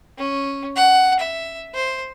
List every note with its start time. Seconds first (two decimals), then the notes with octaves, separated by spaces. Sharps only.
0.18 C#4
0.76 F#5
1.20 E5
1.75 C5